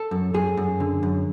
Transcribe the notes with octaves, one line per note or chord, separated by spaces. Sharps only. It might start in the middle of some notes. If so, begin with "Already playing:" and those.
Already playing: A4
F#2
F#2 G#4
F#2
D3
F#2